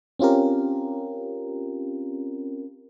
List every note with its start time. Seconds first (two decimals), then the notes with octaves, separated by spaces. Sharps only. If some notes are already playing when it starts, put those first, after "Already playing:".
0.19 C4 C#4 F4 G4 A#4